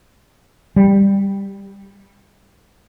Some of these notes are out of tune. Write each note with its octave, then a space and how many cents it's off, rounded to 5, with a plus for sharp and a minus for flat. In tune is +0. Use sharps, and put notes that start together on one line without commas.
G3 +10